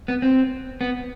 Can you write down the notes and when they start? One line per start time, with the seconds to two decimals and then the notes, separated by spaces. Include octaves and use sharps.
0.08 B3
0.22 C4
0.81 B3